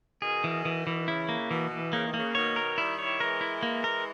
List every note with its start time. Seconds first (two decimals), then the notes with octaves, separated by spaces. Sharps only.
0.22 B2 D#3 G#4
0.44 E3
0.65 E3
0.87 E3
1.08 C#3 E4
1.29 A#3
1.50 B2 E3
1.71 E3
1.92 C#3 A#3
2.05 D#3
2.14 C#3 A#3
2.35 B2 D#3 C#5
2.56 A#4
2.77 D#3 G3 E4
2.99 C#5
3.20 E3 G#3 A#4
3.41 E4
3.63 A#3
3.84 A#4